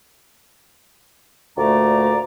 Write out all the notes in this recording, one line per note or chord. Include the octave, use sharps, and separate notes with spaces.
D2 A#2 A3 D5 A#5